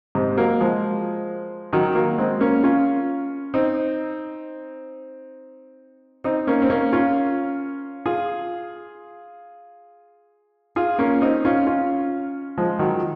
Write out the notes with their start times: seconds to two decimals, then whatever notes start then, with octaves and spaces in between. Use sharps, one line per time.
0.15 G#2 C3
0.37 F#3 A#3
0.60 F3 G#3
1.73 D#3 F#3
1.95 F#3 A#3
2.18 G#3 C4
2.40 A#3 C#4
2.63 C#4 F4
3.54 C4 D#4
6.24 C4 D#4
6.47 A#3 C#4
6.62 C4
6.70 A#3 C#4
6.93 C#4 F4
8.06 F4 G#4
10.76 F4 G#4
10.99 A#3 C#4
11.22 C4 D#4
11.45 C#4 F4
11.66 C#4 F4
12.58 F3 G#3
12.79 D#3 F#3